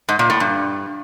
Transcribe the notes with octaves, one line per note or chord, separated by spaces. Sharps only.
G#2
A#2
A2
G2